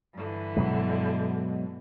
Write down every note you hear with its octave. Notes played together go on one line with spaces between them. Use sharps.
G2 D3 E3
B2 F#3 G#3